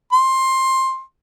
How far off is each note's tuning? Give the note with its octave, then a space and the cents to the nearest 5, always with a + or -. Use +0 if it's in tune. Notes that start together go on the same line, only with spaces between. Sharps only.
C6 +15